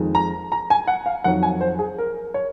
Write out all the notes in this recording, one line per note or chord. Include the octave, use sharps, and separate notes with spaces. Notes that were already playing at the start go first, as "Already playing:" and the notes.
Already playing: F2 D#3 G#3
A#5
A#5
G#5
F#5
F5
F2 D#3 F#3 F#5
G#5
C5
G#4
A#4
C#5